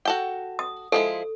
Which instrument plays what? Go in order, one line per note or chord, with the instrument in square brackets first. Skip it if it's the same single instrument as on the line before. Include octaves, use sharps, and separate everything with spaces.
[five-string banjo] F#4 A4 G5
[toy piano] D#6
[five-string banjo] F3 G#3 E4 [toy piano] A4